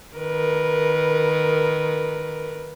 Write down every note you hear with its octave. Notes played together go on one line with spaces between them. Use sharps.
D#3 A#4 B4